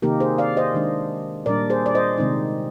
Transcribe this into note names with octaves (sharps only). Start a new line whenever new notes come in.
C3 D#3 A#3 D#4 G4 A#4
G#4 C5
D5 F5
C5 D#5
D#3 G#3 D4
A#2 G3 D4 A#4 D5
G#4 C5
D5
C5 D#5
C3 D#3 G#3 C4 D#4